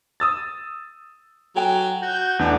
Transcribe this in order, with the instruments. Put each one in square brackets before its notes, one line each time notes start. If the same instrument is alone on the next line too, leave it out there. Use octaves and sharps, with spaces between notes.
[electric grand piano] D#6 E6 A6
[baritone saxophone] F#3 [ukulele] A4 G5 G#5
[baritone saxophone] F#4 [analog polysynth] G6
[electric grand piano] E2 [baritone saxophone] B2 [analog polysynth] A3 D4 F#5